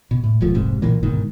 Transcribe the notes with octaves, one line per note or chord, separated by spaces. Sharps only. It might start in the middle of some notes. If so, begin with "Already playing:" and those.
B2
A2
D#1 B1 F3 A3
F1 C2 G#2 C3
B1 A#2 E3 A#3
G1 G#2 B2 D#3